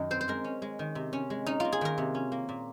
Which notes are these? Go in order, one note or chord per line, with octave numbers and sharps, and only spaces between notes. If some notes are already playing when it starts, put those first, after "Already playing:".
Already playing: F#2 D#3 D#5
C4 C5
C5
G#3 A#4
C#4
G#3
D#3
C3
C#4
G#3
C#4 D#4
A#3 F4
G#4
D#3 A#4
C3
C#4
A#3
A#2